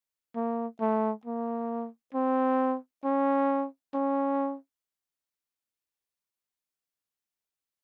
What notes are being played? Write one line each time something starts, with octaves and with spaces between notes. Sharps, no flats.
A#3
A3
A#3
C4
C#4
C#4